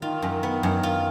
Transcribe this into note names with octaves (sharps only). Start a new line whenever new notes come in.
D#3 F4
F#2
B3
F#2
F4